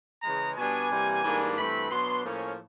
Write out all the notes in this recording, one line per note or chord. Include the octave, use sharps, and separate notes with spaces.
C#3 E3 G#3 A#5
B2 G3 B3 D4 G#5
C3 E3 G3 A#3
G#2 E3 G3 A#3 D4
G2 E3 A3 C4 B5
B2 F#3 B3 D4 C6
A2 F3 A#3 C#4